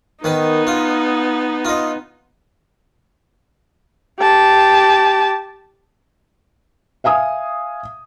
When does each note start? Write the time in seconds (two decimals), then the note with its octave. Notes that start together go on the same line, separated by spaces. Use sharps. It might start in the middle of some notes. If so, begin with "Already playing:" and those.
0.24 D#3 B3 D#4 B4
0.67 F4
1.65 F4 D#5
4.20 G4 A5
7.04 E5 F5 G#5 D#6